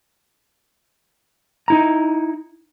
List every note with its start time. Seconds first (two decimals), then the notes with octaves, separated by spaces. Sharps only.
1.68 D#4 E4 A#5